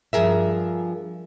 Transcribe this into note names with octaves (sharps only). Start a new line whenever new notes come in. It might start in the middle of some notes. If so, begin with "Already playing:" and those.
G2 F3 G#4 A#4 E5